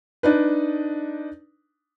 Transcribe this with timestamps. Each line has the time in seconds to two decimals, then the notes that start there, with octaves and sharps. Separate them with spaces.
0.23 D4 D#4 B4